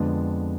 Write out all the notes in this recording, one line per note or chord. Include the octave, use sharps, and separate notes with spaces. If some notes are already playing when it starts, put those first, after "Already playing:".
Already playing: F2 D3 G#3 B3 D4